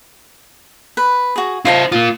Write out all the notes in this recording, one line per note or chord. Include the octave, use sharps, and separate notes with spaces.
B4
F#4 G#4
E4 F4 C5 D#5 A5
A#3 F4 D#6